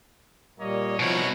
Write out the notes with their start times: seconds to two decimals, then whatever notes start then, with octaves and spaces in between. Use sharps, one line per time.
0.59 A#2 G3 A#3 C#5 D#5
0.99 C2 B2 F3 D#4 F#4 C#5